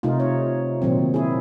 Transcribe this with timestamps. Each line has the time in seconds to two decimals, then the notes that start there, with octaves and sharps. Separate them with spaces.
0.03 C3 A3 D#4 F4
0.20 C#5
0.82 A#2 D#3 F#3 C4
1.14 E4 G#4